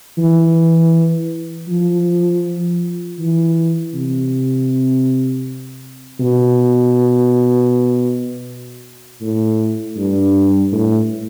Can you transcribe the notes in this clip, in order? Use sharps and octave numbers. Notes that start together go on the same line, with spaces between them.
E3
F3
E3
C3
B2
A2
G2
A2